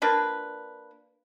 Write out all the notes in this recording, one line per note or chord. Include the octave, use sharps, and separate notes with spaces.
A#3 D4 F4 B4